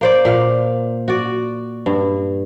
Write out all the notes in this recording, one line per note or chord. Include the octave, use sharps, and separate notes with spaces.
A#3 C5 D5
A#2 F5
F#4 D5
G2